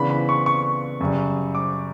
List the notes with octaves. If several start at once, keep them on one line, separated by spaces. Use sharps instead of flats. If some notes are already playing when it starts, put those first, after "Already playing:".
Already playing: C#3 E3 B3 D4 B5
B5
C#6
C#6
F#2 C#3 G3
D6